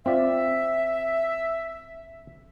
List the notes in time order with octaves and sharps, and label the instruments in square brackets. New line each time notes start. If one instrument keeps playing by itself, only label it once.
[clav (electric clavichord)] C4 F4 D5 [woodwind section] E5